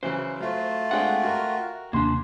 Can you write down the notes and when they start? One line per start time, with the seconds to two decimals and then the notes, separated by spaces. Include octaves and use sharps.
0.03 C#3 E3 F#3 C5
0.40 F#3 A3 F4
0.91 G#3 C4 D4 F#5 G5
1.23 F#4 A#4
1.93 D#2 C3 A#3 D4 C6